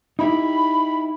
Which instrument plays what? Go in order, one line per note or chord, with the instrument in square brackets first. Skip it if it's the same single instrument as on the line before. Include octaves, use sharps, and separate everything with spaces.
[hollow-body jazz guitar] D#4 E4 G4 [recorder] B5